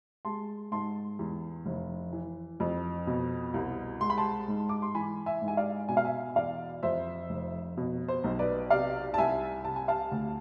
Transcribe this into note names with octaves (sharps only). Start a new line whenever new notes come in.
G#3 A5 C6
G#2 A5 C6
E2
F1
E3
F2
B2
C2
G#3 C6
B5
A5 C6
G#2
D6
C6
E3 G#5 B5
E5 G#5
G#2
G#5
D5 F5
B2 G#5
F5
E5 G#5
E2 D5 F5
F2 C5 E5
F1
B2
C5
B1
B4 D5
C3 D5 F5
A5
C2 E5 G#5
C3 A5
G#5
F5 A5
D2